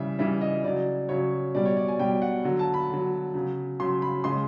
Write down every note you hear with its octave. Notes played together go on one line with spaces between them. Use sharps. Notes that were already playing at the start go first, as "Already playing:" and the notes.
Already playing: C#3 E3 G3 E5
C#3 E3 G3 E5
D#5
C#3 F#3 D5
C#3 F#3 C#5
B2 G3 D5
C#5
D5
G#5
B2 G3 G5
F#5
D3 F#3
A5
B5
D3 F#3
C#3 F#3
C#3 F#3 C6
B5
C#3 F3 G#3 C6